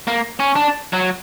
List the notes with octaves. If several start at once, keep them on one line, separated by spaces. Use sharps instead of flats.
A#3
C#4
D4
F#3